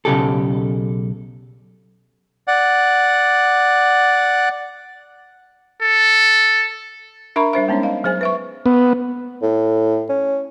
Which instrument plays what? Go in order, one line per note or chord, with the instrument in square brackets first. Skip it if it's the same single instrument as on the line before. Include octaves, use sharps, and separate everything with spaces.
[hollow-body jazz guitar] B1 C#3 G4 A4
[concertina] D5 F#5
[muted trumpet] A4
[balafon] D4 A#4 E5 A#5 B5 C#6
G3 D4 C5 E5
G#3 B3 C#4 D#4 C#5
D#5 F5
F#3 G#4 C5 G#5
B4 E5 C#6
[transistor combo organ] B3
[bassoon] A2
C#4